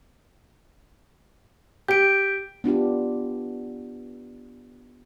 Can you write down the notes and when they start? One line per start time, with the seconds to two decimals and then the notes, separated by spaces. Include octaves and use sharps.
1.88 G4 G6 D7
2.64 B3 D4 F4 G4